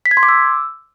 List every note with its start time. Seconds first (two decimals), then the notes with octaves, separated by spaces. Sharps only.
0.06 B6
0.11 G#6
0.17 C6
0.23 D6
0.29 E6